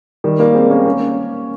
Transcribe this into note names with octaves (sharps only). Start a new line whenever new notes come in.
D#3 G3
G3 A#3
G#3 C4
A#3 C#4
A#3 C#4